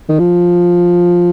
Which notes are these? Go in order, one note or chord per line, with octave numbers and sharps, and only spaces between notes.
D#3
F3